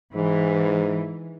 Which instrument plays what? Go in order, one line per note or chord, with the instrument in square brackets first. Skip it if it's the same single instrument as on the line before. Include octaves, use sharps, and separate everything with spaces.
[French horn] G#2 [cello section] E3